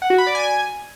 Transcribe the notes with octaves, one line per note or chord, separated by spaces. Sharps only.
F#5
F#4
B5
D5
G#5